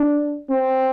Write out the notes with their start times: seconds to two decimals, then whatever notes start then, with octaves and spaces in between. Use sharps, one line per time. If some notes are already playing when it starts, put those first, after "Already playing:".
Already playing: D4
0.50 C4